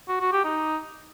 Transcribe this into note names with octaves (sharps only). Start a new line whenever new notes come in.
F#4
F#4
G4
D#4